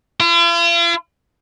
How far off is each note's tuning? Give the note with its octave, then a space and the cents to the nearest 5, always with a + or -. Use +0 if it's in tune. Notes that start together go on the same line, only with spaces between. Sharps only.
F4 -45